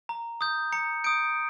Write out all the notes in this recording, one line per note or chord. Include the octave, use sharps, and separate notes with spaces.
A#5
D#6 G6
A#5 C#7
D#6 G6 D7